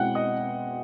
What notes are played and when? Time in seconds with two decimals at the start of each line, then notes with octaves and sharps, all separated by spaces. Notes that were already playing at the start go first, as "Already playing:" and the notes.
Already playing: B2 G#3 C4 E4 F#5 G5 F#6
0.15 D#5 D#6